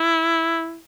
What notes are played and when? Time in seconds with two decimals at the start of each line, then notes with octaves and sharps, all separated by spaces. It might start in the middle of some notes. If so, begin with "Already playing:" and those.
Already playing: E4